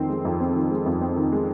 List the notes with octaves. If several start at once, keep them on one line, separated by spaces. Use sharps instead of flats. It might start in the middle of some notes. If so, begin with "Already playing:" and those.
Already playing: F2 D#3 C4
G#3
F2
C4
D#3
G#3
F2
C4
D#3
G#3